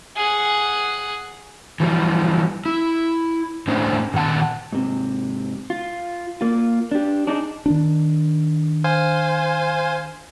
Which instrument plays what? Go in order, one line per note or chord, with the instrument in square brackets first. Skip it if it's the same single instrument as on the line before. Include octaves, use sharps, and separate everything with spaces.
[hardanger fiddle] G#4 F#5
[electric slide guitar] E3 F3 G3
E4
A2 A3 C#4 D4 C5
A#2 D#3 F#5 A5
G#2 C3
F4
A#3 F4
D4 G4
D4 D#4 G#4
[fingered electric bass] D#3 D4
[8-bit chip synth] C5 F5 G#5